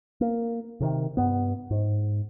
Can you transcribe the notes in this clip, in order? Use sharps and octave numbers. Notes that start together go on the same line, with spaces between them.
A#3
C3 D#3
G2 B3
G#2